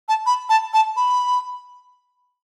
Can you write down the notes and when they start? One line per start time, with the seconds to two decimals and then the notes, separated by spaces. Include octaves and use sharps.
0.08 A5
0.26 B5
0.49 A5
0.73 A5
0.96 B5